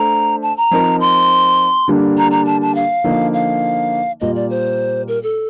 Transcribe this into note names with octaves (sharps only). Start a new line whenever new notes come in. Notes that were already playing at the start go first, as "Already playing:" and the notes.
Already playing: A3 D4 A4 C5 A#5
A5
A#5
F3 C4 D#4 A#4
C6
D3 G3 A#3 D4
A#5
A#5
A5
A5
F5
D3 F3 A#3 D#4
F5
A#2 G3 A#3 F4 D#5
D5
C5
A#4
A4